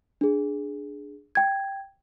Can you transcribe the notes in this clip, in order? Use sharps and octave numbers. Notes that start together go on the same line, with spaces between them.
D4 G#4
G5 G#6